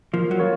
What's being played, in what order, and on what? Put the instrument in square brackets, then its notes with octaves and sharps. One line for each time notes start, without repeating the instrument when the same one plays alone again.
[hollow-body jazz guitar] F3 [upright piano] A#3
[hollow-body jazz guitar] F#3
[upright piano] F4 A#4 C#5